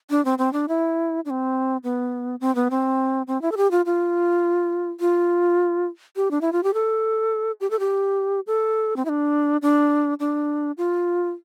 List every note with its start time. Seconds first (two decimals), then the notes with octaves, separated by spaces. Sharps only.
0.10 D4
0.25 C4
0.38 C4
0.53 D4
0.68 E4
1.25 D4
1.30 C4
1.84 B3
2.41 C4
2.55 B3
2.70 C4
3.27 C4
3.42 E4
3.52 A4
3.57 G4
3.71 F4
3.86 F4
5.00 F4
6.16 G4
6.31 D4
6.41 E4
6.52 F4
6.63 G4
6.74 A4
7.61 G4
7.71 A4
7.80 G4
8.47 A4
8.96 C4
9.05 E4
9.09 D4
9.62 D4
10.20 D4
10.78 F4